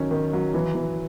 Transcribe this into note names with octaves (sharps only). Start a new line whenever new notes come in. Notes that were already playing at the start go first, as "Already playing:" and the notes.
Already playing: D#3 F#3 C#4
D#3
F#3
E3
E3